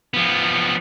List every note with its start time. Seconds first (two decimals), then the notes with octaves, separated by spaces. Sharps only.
0.14 F3 B3